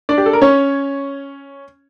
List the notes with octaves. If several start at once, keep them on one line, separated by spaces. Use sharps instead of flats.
D4 D5
G4
A4
A#4
C#4 C#5